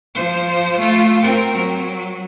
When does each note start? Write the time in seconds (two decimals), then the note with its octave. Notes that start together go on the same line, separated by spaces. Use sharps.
0.15 F3 C5
0.79 A3 F4
1.22 C4 A#4
1.56 F#3